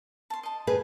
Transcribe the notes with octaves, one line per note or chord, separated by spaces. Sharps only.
A5 C6
D#5 A5
G2 G#4 B4